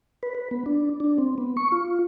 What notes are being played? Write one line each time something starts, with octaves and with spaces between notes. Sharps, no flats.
B4
B4
B3
D4
D4
C4
B3
C#6
F4